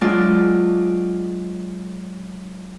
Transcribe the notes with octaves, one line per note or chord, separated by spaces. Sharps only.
F#3 G#3 D4 F4 D5